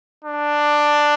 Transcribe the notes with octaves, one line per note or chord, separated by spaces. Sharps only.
D4